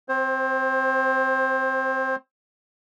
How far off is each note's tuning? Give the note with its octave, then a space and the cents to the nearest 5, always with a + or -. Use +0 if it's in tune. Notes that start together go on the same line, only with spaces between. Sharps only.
C4 -5 C5 +25